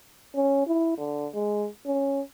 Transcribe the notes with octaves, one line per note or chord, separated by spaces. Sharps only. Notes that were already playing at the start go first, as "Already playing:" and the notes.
C#4
E4
D3
G#3
C#4